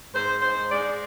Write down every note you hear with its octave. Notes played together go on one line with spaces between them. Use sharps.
G#2 C5
G#2 C5
G#3 D5